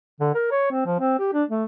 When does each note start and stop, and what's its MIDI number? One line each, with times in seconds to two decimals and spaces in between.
0.20 0.30 50
0.35 0.51 70
0.51 0.69 73
0.71 0.85 60
0.85 0.99 53
1.00 1.15 60
1.19 1.29 67
1.33 1.44 62
1.49 1.64 57